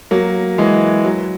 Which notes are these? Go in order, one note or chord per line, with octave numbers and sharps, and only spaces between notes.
F#3 A#3
E3 G#3
F#3